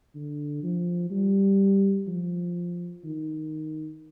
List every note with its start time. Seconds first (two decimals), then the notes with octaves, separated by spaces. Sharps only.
0.15 D3
0.63 F3
1.11 G3
2.08 F3
3.04 D#3